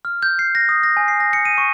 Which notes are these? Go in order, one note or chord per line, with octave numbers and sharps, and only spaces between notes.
F6
G6
C7
A#6
D#6
A#6
G#5
C7
A#6
C#7
D#7
C#6